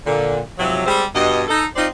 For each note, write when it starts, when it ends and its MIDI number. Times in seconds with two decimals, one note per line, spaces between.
0.07 0.40 46
0.07 0.40 50
0.59 0.86 44
0.59 0.86 48
0.59 0.86 53
0.59 0.86 54
0.87 1.04 55
0.87 1.04 56
0.87 1.04 60
1.15 1.43 43
1.15 1.43 47
1.15 1.43 75
1.48 1.66 63
1.48 1.66 69
1.76 1.87 60
1.76 1.87 63
1.76 1.87 65
1.76 1.87 72
1.76 1.87 74
1.76 1.87 75